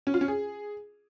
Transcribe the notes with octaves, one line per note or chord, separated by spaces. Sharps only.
C#4
F4
C#4
G#4